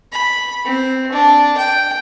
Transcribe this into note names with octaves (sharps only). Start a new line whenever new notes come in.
B5
C4
D4
G5